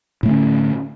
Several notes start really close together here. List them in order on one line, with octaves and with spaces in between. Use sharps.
A2 A3 D3 C#4